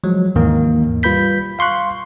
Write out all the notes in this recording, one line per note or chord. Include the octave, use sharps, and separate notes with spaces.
F3 F#3 G#3
D#2 G#2 D#3 E3 A#3 D#4
G3 F4 B4 B5 G6 B6
F5 C6 C#6 F#6